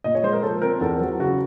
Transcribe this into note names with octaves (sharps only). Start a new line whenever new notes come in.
A#2 D#5
C#5
G#3 C5
A#4
F3 A4
C4 A#4
E2 A4
F#3
C#3 F#4